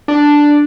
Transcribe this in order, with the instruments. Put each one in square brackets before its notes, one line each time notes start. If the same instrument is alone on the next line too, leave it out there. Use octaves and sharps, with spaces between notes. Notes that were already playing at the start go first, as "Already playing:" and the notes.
[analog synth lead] D4